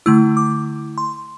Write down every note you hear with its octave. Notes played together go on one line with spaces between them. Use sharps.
D3 A3 E4 E6
D6
C6